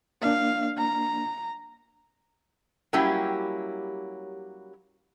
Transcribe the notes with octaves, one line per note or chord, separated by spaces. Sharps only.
A#3 D4 F5
A#5
F#3 G3 A#3 C#4 E4 G4